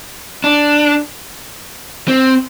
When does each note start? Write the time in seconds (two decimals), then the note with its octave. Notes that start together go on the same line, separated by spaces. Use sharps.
0.44 D4
2.08 C4